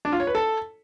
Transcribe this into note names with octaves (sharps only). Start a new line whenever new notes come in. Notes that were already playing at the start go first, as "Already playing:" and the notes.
D4
F4
C#5
B4
A4